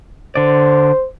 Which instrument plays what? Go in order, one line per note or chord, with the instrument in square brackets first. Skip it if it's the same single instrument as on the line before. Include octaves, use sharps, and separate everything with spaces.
[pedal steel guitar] D3 D5 [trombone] C5